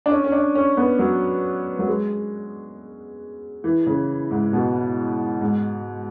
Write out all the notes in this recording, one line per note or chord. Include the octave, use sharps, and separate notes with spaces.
D4
C#4
C#4
D4
C#4
B3
F#3
F#3
G#3
E3
C#3
G#2
B2
G#2